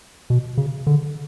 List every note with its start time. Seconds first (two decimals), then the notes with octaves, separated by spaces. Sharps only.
0.30 B2
0.58 C#3
0.87 D3